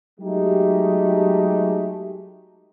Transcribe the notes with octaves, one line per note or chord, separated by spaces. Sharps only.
F#3 G#3 A3 D#4 G4